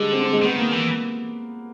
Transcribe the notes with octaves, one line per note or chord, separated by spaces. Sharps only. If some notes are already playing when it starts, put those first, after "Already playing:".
Already playing: D3 G3 G#3
C4
C4
G#3
D#3 B3
A#3
E3